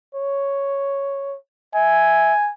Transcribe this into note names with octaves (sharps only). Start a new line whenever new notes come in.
C#5
E5 G#5